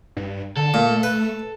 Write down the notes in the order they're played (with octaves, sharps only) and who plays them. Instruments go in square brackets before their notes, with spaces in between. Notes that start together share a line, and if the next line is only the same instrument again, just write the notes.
[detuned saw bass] G2
[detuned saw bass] D3 [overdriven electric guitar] A4
[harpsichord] A#2 [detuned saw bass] A3
[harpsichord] B4